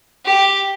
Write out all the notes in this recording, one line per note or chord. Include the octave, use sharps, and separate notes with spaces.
G4